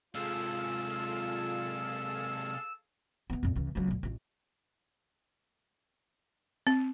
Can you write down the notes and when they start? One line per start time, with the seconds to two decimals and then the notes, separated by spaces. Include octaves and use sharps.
0.15 C3 G#3 F4 G#4 A4 F5 E6
3.30 E3 B3
3.43 F2 A#2
3.56 C#2 E3
3.75 C#2 F#3
3.88 D2 A#2
4.03 A1 F4
6.67 C4